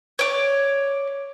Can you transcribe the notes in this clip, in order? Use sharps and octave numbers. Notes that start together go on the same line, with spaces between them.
C#5 D5